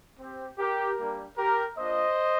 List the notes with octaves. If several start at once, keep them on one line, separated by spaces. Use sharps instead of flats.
C4 G4
G4 A#4
G3 A#3 D4 G4
G4 A#4
A#3 D4 F4 C5 D#5